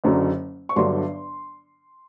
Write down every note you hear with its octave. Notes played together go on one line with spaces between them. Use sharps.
F#1 F#2 D3 F#3
C#6
G1 G2 D3 F#3 C6